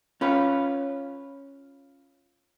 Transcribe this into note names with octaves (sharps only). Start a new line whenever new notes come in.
C#4 F4 B4